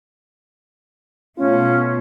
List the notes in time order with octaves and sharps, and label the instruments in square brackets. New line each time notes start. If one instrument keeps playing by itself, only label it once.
[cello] B2 A3 [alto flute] C#4 [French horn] F4